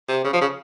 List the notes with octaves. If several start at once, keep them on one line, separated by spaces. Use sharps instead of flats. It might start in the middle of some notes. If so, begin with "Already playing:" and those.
C3
C#3
F3
C#3